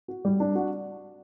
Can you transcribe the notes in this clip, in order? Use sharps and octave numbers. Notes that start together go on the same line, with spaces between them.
F#4
G3
D4
F#4